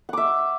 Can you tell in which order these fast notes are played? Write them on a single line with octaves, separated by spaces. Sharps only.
F#5 D6 E5